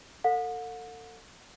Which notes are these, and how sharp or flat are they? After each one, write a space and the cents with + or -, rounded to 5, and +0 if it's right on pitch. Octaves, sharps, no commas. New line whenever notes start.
A4 +35 F#5 -40